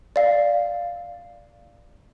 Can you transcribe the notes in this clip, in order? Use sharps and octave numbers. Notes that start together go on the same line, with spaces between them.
D5 F5